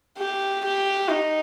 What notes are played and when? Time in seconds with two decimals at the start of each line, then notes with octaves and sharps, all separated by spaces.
0.18 G4
0.64 G4
1.09 D#4